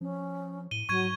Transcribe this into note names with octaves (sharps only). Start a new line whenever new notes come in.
F3 C#4
A2 D#7 G7
G#2 F#3 C#6 G#6 D#7